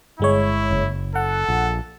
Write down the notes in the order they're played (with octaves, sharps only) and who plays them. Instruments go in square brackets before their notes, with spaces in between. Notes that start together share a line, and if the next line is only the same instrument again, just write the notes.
[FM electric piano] G1 G#3 C#5 [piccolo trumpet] E4
[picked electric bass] F#1
[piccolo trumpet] A4 [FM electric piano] F#5
[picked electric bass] A#1